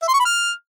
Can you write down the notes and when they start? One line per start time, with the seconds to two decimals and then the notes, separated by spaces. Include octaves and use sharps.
0.02 E5
0.08 C6
0.14 C#6
0.20 B5
0.25 F6